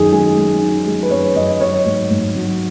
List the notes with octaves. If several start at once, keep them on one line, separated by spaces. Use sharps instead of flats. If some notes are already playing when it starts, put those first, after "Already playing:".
Already playing: F#2 D#3 G#4
G#3 G#4
G#3
D#3
G#3
B4
F#2 C#5
F#2 D#5
F#3 C#5
G#2
G#2
F#3